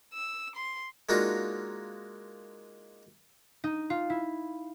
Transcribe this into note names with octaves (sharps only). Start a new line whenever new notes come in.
E6
C6
G#3 A#3 D4 D#4 F4 F#4
D#4
F4
E4